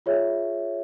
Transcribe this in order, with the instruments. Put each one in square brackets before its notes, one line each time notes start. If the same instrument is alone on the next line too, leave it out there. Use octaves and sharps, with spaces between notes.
[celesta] F4 G#4 C#5 E5